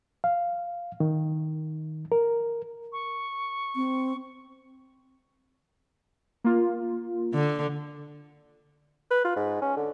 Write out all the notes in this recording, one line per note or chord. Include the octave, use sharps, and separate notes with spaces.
F5
D#3
A#4
C#6
C4
A#3 F4
D3
B4
F4
G#2
C#4
D3